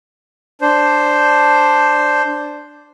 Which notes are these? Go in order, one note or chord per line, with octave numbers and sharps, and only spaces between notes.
D4 C5